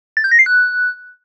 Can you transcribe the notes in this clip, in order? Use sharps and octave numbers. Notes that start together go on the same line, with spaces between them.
A6
G6
A#6
C7
F#6